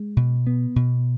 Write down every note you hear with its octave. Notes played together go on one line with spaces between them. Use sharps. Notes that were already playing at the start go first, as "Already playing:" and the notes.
Already playing: G#3
B2
B3
B2